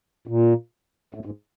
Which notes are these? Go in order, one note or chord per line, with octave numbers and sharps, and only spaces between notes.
A#2
A2
G#2